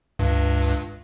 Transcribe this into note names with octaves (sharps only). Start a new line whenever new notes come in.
C#2 G2